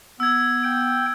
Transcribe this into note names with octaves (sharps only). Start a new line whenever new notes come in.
B3 E6 G#6
G5